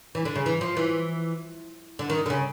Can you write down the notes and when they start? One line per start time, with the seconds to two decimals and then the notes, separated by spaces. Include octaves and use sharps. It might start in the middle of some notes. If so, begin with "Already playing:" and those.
0.15 E3
0.25 D3
0.35 C#3
0.46 E3
0.61 F3
0.77 E3
1.99 D3
2.10 D#3
2.26 D3
2.30 C#3